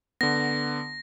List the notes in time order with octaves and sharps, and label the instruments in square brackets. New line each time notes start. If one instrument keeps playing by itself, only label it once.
[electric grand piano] D3 B3 [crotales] A#6